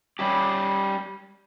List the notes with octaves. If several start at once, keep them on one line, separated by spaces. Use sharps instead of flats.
G3 C#4 G4